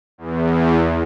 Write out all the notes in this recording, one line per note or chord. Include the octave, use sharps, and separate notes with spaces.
E2